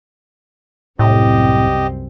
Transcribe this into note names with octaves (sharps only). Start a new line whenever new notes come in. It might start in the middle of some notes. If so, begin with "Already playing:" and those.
C2 F#2 A2 C4 G4 D#5